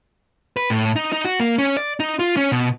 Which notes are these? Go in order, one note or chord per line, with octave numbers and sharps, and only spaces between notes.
B4
A2
D#4
D#4
F#4
A#3
C#4
D5
D#4
F4
C#4
B2